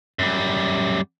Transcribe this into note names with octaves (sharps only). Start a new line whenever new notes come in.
F#2 G3